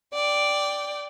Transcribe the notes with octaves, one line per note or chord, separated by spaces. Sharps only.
D5 G5